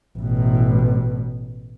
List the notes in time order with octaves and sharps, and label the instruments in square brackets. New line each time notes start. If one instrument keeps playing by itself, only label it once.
[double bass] A1 B2